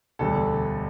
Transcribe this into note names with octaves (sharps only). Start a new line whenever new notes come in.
E1 D2 D3 G3 A4